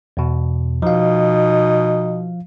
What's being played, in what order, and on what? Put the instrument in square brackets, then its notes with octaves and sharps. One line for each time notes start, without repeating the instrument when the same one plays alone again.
[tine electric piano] E2 B2
[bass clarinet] B2 [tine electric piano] F3 F5 [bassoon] D#4